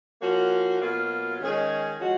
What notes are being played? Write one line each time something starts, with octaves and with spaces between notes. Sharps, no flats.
F3 A#3 C#4 F#4
B2 F#3 A#3 F4
D#3 G#3 C#4 G#4
F3 G#3 C#4 F#4